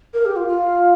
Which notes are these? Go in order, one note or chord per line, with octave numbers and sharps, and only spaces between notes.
A#4
G4
F4
F4